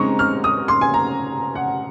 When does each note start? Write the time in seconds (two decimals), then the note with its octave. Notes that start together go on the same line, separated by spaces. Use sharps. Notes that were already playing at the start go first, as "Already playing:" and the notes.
Already playing: C#3 G#3 C4 D#4 A#5 C#6
0.19 F6
0.44 D#6
0.68 C6
0.81 G#5
0.94 A#5
1.55 F#5